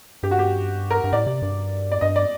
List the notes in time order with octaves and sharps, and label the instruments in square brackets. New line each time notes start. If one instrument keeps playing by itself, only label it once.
[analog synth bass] G2 [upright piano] G4
[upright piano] F#4
G4
A#4
[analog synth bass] G2
[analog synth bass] A2 [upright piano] D5
[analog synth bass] C3
G2
[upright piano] D5
[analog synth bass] G2 [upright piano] D#5
[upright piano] D5